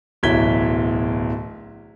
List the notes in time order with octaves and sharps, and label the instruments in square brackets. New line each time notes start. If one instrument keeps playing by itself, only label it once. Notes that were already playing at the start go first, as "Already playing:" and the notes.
[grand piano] D1 B1 E3 G#6 B6 G7